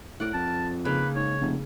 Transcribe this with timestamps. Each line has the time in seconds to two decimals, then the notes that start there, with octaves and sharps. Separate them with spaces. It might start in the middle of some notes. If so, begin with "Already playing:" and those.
0.20 A2 A#4 D5 F#5
0.34 F2 A5
0.85 C#3 A#3 D#4 B4
1.16 G#2 C#5
1.41 F1